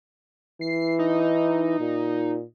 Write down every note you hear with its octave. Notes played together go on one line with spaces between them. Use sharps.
E3 C7
D#4
A#2